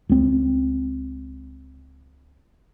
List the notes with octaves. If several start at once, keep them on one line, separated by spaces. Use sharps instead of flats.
C#2 C4